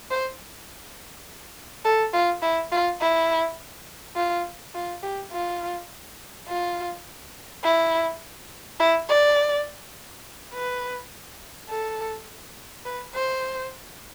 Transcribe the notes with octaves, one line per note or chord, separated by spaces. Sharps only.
C5
A4
F4
E4
F4
E4
F4
F4
G4
F4
F4
E4
E4
D5
B4
A4
B4
C5